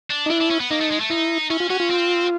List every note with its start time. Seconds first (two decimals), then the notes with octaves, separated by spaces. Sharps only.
0.11 D4
0.26 D#4
0.30 D4 E4
0.41 D4
0.51 C#4
0.60 B3
0.71 A#3 D#4
0.81 A3
0.91 G#3
1.00 A3
1.10 D#4 E4
1.50 C#4 E4
1.60 F4
1.70 C#4 F#4
1.80 F4
1.90 C4